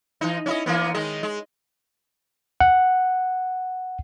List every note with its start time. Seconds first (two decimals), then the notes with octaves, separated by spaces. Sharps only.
0.21 E3 D#4
0.46 C#4 E4 D#5
0.66 E3 A#3 B3
0.94 D#3 G#3 D#5
1.23 G#3
2.60 F#5